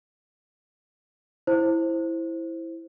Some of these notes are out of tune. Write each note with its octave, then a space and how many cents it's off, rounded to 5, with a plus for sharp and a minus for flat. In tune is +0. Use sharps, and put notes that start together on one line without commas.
E4 +0 C5 +10